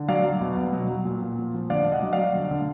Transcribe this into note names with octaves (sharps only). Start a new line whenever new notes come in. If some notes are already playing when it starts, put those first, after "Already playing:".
Already playing: D3
F#3 D5 F5
F#3
B2
B2
F#3
F#3
A#2
A#2
F3
F3
D3 D5 F5
D3
D#5 F#5
F#3
D5 F5
F#3
D3
D3